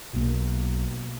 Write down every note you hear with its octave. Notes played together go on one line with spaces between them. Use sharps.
B1 B2 A#3